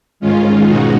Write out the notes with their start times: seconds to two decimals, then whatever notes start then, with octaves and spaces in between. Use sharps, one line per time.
0.20 G#2 D#3 G#3 C#4 F4
0.67 B2 G#3 D#4 F#4